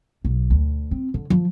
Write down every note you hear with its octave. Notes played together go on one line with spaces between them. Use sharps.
B1
D2
C4
D3
F3